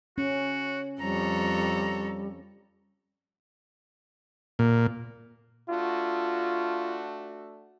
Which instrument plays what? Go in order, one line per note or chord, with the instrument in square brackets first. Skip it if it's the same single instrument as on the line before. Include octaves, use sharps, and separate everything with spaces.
[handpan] C#4 [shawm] F#4
[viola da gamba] F2 A4 C#5 [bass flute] G3 [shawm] A#5
[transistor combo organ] A#2
[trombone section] A3 D4 F#4 [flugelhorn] F4